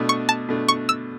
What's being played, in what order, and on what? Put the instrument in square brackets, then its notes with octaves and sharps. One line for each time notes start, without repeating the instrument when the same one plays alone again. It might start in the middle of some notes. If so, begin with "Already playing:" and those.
Already playing: [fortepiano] B2 A3 D4
[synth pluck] C#6
A5
[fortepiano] B2 A3 D4
[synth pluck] C#6
E6